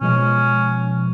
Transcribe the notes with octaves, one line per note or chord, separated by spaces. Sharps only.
B2 F3 G#3 C#4